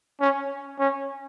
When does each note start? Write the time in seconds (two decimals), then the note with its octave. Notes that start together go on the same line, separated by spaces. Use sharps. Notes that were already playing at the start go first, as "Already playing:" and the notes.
0.20 C#4
0.79 C#4